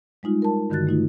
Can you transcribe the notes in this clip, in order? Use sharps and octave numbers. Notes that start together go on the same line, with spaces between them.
G3 G#3 D#4 F4
A#4 A5
G2 D3 D#3 F#4 F#6 A6
A3 D#4 F4